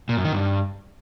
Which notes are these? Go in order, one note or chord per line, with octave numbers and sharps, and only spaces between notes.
A#2
F#2
D#3
G2